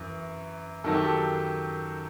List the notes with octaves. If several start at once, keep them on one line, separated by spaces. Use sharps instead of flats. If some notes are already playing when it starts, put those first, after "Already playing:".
Already playing: F#2 E3
F#2 D#3 F#3 A4
G4
A4